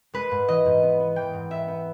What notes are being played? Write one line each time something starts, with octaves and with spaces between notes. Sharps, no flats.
G#3 B4
G#2
E3 D#5
G#2
B3
B3
E3 G5
G#2
B3 E5
B3